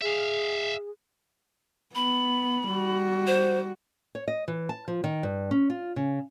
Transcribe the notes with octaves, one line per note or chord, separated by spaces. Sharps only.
G#4 E5 F5
B3 B5
G3 F#4
C5
C#5
D#5
E3
A5
F3
D#3
G2
C#4
F4
C#3